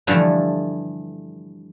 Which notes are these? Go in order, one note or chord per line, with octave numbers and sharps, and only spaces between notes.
G2 D3 E3 F3 A3